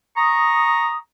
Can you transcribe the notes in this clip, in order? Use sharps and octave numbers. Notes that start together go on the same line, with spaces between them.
A#5 C#6 D#6